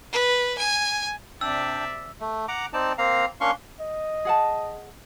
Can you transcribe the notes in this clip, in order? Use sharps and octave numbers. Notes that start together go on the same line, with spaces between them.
B4
G#5
C3 D4 D5 E5 G5 E6
A3
F#5 A#5 D6
C4 D#4 D5 A5
A#3 C4 F5 A#5
A#3 C#4 D4 F5 C6 C#6
D#5
G#4 F#5 A5